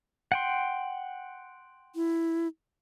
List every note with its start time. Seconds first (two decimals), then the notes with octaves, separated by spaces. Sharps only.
0.32 F#5 G5 C6
1.96 E4